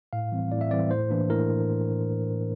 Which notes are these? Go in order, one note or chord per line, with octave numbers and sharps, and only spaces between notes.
A2 F5
E3 G3 C4
A2 D5
E5
E3 G3 C4 D5
A2 C5
E3 A#3 D4
A2 A#4